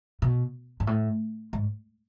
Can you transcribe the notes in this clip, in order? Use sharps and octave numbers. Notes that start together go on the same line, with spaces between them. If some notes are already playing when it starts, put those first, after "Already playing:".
B2
G#2
A2
G#2